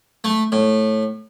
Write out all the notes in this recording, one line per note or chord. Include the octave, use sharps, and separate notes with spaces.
A3
A2